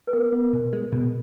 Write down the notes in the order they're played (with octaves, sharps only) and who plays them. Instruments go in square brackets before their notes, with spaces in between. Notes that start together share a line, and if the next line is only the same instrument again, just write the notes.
[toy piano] B4
[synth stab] B3 [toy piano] A#4
[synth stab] B3
B2
G#3
B2